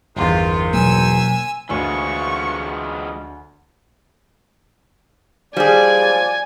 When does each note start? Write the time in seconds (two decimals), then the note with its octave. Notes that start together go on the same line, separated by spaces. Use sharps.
0.17 G1 E2 C3 D#3 F4
0.73 B2 F#3 A#3 G#5 E6
1.69 D2 D3 E3 F3 G#3 G#5 C#6
5.57 F3 G3 G#4 D5 G#5